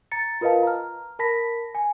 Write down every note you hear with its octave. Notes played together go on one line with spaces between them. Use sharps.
A#5 A6 C#7
F4 A#4 B4 D#5 F5 A5
A#5 F6
A#4 A5 B5 A#6 B6
G#5